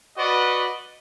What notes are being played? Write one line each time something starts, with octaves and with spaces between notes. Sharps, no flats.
F#4 B4 D5 D#5